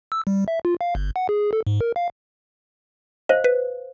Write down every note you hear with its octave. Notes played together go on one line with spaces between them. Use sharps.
E6
G3
E5
F4
F5
G1
F#5
G#4
A4
G#2
A#4
F5
C5 D#5 F5
B4